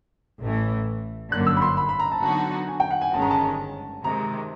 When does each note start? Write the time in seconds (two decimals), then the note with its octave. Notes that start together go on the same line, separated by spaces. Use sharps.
0.41 A1 A2 E3 A3
1.31 G1 F#2 D3 F#3 A#3 F#6
1.47 E6
1.57 B5
1.62 C6
1.77 B5
1.89 B5
1.99 A#5
2.12 A5
2.23 D3 F#3 B3 D#4 F#4 A5
2.68 G#5
2.80 G5
2.91 F#5
3.01 G#5
3.13 G1 G2 D#3 G#3 C#4 A5
3.22 A#5
3.31 A5
4.04 C3 D#3 G#3 A#5